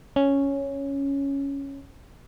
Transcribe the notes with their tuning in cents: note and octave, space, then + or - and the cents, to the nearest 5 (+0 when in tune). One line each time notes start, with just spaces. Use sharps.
C#4 +0